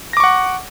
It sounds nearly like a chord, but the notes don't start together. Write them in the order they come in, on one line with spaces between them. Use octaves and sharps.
A#6 D6 C#6 F#5